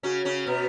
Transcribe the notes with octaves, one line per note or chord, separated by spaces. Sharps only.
C#3 C#4 F#4
C#3 C#4
B2 B3